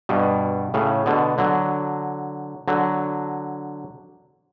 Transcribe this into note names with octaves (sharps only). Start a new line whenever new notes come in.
G2 B2
A2 C#3
B2 D3
D3 F#3
D3 F#3